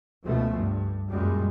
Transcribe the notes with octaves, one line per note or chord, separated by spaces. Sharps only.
C#2 B2 F3 A3
G2
F#2 A#2 G3 G#3